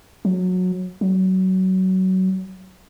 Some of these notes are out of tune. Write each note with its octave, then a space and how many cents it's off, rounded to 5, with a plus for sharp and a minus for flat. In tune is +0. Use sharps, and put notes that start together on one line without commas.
F#3 -20
F#3 +20